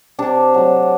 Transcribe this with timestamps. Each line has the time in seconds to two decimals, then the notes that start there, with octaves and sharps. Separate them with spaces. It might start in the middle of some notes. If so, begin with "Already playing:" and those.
0.19 C3 D4
0.54 F#3 A3